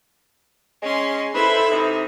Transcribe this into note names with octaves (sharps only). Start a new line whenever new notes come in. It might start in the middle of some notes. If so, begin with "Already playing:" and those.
G#3 C#4 C6
E4 A4 B4 C5 E5 B5
C3 D#4